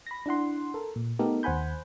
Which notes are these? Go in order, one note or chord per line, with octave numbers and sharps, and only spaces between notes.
B5 A#6
D4 E4 F#5 C6
A4 A#4
A#2
A3 B3 D#4 G4 A4 A#4
D#2 C5 F#5 G#5 B5 G6